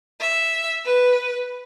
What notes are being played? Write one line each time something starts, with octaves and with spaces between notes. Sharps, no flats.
E5
B4